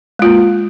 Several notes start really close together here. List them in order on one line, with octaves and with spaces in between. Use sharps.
G#3 F4 A#3